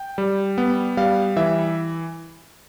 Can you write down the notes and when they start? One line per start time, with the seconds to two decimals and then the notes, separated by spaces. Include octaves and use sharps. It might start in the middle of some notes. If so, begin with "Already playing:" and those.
Already playing: G5
0.18 G3
0.58 B3
0.97 G3 F5
1.36 E3 E5